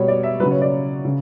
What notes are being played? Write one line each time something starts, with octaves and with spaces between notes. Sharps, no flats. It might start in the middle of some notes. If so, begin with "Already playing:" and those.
Already playing: B2 G3 C#5
D5
E5
C#3 F#3 B4
C#5
D5
C#3